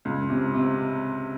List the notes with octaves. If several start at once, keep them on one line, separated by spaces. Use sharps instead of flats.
C#2
C3
C3